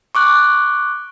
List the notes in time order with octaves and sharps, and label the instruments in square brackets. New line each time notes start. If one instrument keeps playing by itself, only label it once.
[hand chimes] C#6 D6 F#6